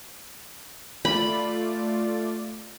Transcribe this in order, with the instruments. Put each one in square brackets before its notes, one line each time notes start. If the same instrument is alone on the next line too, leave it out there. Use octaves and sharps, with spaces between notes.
[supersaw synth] A3 F4 D5 [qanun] B5